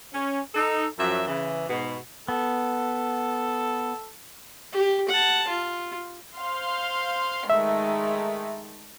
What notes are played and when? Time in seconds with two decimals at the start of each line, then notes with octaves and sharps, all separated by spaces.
0.13 C#4
0.55 D#4 A4
0.99 F#2 F3 F#3 E5
1.28 C#3 E3
1.69 G#2 B2
2.28 B3 A4
4.72 G4
5.09 F#5 A5
5.48 F4
6.36 C5 F5 C6
7.50 D#3 G#3 A3 E5